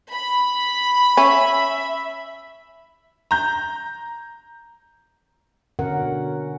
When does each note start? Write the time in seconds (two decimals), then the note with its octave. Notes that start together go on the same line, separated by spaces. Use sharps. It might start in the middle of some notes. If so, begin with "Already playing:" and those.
0.12 B5
1.17 C#4 E5
3.31 A#5 G6
5.79 B2 D3 C#4 A#4 F#5